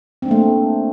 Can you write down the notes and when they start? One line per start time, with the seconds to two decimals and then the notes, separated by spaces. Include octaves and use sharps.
0.22 C4
0.25 D4
0.28 A#3
0.31 A3